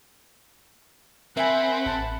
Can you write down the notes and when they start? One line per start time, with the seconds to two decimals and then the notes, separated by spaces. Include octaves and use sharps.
1.37 C4 A#4 E5 F#5 G#5 B5
1.86 A1 A5